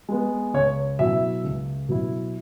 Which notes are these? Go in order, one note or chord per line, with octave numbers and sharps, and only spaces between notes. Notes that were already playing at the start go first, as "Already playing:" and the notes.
G#3 B3
C#2 C#5
B2 F#3 E4 E5
C#2
B2 F#3 E4